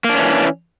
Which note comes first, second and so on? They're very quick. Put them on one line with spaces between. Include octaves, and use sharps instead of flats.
A#3 D4 C#4 E3